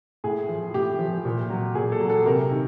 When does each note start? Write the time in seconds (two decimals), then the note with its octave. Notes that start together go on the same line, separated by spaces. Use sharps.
0.24 A2 G#4
0.49 F3
0.74 A2 G4
0.99 F3
1.25 A#2
1.50 F#3
1.75 A#2 G#4
1.92 A4
2.00 F#3
2.09 A4
2.26 C3 A#4
2.51 D#3